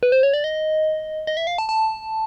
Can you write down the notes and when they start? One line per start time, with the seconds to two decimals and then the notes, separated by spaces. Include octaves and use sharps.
0.03 B4
0.12 C5
0.23 C#5
0.34 D5
0.44 D#5
1.27 D#5
1.37 E5
1.47 F5
1.58 A5
1.69 A5